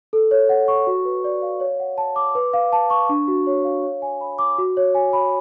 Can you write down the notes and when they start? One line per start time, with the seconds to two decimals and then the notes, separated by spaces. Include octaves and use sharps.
0.13 A4
0.31 C#5
0.49 F#5
0.68 C#6
0.87 F#4
1.05 B4
1.24 D5
1.42 F5
1.60 C#5
1.80 F#5
1.98 A5
2.16 D6
2.35 B4
2.53 F5
2.72 A5
2.90 C#6
3.09 D4
3.28 F#4
3.47 C#5
3.65 F5
3.83 C#5
4.02 G#5
4.21 B5
4.39 D6
4.58 F#4
4.77 C#5
4.95 G#5
5.13 B5